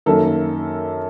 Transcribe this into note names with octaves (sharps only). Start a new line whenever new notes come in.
F#2 D#3 A#3 A4